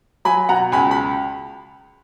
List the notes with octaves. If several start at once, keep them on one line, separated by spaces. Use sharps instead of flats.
F#3 G#5 B5
B2 F#5 A#5
C#2 G#5 B5
B5